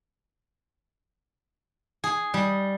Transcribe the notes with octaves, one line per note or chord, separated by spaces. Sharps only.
G#4
G3